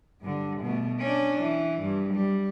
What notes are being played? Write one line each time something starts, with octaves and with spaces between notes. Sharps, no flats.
G2 D3
B2 A3
C#4 D4
E3
G2
G3